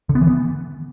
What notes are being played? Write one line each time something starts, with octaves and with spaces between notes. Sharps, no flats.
D3
B3
E3
B3